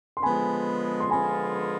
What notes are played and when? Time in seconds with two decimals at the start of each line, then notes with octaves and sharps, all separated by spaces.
0.17 C6
0.22 D3 F3 G#3 B3 G#5 B5
1.00 C6
1.10 D3 F3 G#3 B3 F4 G#5 B5